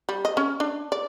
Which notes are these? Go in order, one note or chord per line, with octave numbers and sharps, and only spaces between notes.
G3
D#5
C#4
D4
D5